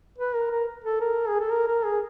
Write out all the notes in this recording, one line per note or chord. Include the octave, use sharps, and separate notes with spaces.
B4
A#4
A#4
A4
A#4
G#4
A4
A#4
A#4
G#4